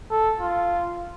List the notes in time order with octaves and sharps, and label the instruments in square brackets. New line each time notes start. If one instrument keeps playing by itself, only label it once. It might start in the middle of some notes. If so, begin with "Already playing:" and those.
[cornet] A4
F4